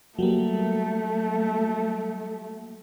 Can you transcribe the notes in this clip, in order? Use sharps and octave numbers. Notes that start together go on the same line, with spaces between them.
F#3 G3 A3 A#3